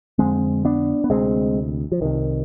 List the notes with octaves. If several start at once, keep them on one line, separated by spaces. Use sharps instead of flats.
F2 D3 G#3 C4
B3 D4
B3
D2 C3 G#3 C4
F3
C2 C3 D#3